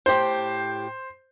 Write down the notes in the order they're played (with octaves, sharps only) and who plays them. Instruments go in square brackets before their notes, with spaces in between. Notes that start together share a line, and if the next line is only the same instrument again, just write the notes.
[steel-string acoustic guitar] A2 G4 [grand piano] C5